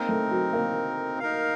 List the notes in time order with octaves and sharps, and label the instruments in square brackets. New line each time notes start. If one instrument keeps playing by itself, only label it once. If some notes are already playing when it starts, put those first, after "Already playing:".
Already playing: [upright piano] A#3 [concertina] C4 D#4 A#4
[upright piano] A3
F#3
A#3
[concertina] D#4 A#4 F5